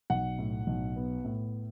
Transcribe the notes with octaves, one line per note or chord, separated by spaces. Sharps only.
B1 F#5
A2
B1
B3
A2